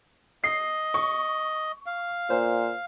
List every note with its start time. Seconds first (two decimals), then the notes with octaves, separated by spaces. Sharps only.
0.44 D#5 C7
0.94 C#6
1.86 F5
2.30 A#2 C5